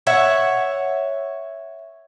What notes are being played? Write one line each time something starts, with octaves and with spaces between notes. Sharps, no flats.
C#5 E5 F#5